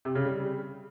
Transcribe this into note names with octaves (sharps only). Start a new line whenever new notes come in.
C3
C#3
G3